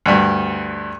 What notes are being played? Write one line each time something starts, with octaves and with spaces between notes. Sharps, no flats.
D2 G2